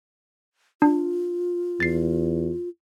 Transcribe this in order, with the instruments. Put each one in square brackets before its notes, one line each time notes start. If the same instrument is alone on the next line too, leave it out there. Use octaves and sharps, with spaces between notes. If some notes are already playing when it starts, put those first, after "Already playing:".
[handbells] D4 [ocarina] F4
[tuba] E2 [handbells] A6 C7